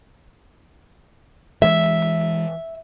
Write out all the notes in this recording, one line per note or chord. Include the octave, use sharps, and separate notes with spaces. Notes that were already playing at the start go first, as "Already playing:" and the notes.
E3 G#3 E5